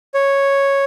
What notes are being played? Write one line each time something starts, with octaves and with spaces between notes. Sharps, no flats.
C#5